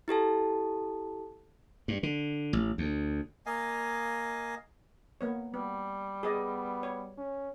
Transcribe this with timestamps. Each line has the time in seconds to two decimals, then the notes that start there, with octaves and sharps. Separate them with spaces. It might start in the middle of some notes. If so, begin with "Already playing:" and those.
0.08 E4 G4 A4 A5
1.88 G2
2.03 D3
2.53 A1
2.78 D2
3.46 A#3 D#5 F5 G#5
5.21 A#3 B3 C#5
5.54 G3 B3
6.23 B3 G#4 D5 D#5
6.83 C#5
7.18 C#4